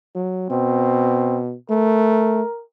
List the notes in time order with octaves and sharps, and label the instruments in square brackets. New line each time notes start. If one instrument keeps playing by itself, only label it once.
[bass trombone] F#3
[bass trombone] B2 [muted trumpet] C4
[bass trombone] A3 [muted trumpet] A#4